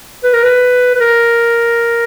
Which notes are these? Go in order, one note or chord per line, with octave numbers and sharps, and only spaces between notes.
B4
A#4
B4
B4
A#4